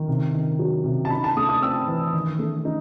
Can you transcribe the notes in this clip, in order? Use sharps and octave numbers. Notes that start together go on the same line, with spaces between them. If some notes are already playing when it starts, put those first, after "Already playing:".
Already playing: D#3
C3
D#3
F#3
C3
A5
D#4 B5
A5
A3 D#6
D#6
C4 E6
E3
D#3
A3
D#4